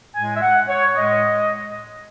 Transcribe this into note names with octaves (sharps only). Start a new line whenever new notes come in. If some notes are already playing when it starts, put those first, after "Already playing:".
A2 G#3 G#5
E5
F#5
C#5
A2 G#3 D#5